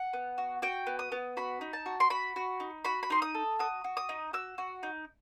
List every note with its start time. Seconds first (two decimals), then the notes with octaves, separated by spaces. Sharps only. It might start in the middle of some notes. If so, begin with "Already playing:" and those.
Already playing: F#5
0.13 B3
0.38 F#4
0.62 F#4 G5
0.87 B3
0.99 D#6
1.12 B3
1.37 F#4 B5
1.61 D#4
1.73 A5
1.86 F#4
2.00 C6
2.10 F#4 B5
2.36 F#4
2.60 D#4
2.85 F#4 B5
3.03 B5
3.10 D#4 C6
3.22 D#6
3.34 A4
3.59 F#4 D#6
3.84 F#4
3.97 D#6
4.09 D#4
4.33 F#4 E6
4.58 F#4
4.83 D#4